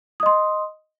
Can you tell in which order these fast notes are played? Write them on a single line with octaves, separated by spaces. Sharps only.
D#6 D#5 C6